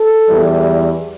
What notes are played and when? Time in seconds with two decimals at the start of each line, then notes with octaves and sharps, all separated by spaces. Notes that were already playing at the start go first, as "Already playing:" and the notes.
Already playing: A4
0.29 E2 E3 G3